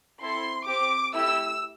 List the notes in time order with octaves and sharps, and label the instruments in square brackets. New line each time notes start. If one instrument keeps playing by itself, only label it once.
[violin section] C4 E4 A4 C6
C4 G4 D6
A3 E4 G4 E6